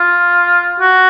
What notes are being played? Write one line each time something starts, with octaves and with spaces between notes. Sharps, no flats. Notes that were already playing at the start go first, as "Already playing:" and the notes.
Already playing: F4
F#4